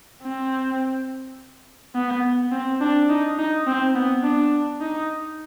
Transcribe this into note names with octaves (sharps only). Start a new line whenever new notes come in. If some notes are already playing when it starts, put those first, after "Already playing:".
C4
B3
C4
D4
D#4
D#4
C4
B3
D4
D#4